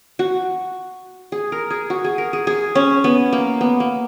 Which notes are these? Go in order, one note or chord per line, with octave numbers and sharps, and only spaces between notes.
F#4
G#4
A#4
G#4
F#4
G#4
A#4
G#4
G#4
C#4
B3
A#3
B3
A#3